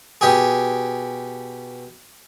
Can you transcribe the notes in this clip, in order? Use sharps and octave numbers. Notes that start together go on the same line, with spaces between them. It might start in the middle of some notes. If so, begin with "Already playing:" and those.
B2 G4 G#4